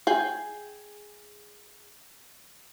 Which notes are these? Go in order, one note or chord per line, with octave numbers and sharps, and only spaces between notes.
G#4 G5 G#5